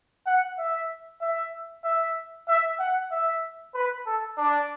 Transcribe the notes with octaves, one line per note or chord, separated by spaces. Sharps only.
F#5
E5
E5
E5
E5
F#5
E5
B4
A4
D4